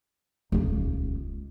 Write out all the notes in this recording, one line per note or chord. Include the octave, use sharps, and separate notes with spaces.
D#1 C#2